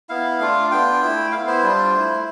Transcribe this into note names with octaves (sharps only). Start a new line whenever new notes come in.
B3 E4 F5
A3 D4 F4
B3 D4 F4 G5
A3 E4
B3 E4 F5
C5
G3 D4 F4
A3 E4